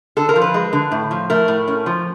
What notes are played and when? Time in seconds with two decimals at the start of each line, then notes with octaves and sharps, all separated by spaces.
0.17 D3 A4
0.29 A#4
0.36 F3
0.42 B4
0.54 G#3
0.73 D3
0.91 A2
1.11 F3
1.30 A3 A#4
1.48 A2
1.68 C#4
1.86 F3